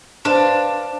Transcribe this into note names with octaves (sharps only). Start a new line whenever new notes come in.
D4 B4 C5 F5